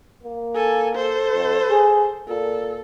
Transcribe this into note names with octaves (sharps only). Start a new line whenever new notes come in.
A#3
A4 G#5
A4 C5
F2
G#4
A#2 A4